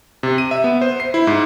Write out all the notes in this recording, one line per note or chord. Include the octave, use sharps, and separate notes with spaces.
C3
D#7
E5
B3
C5
C7
E4
G#2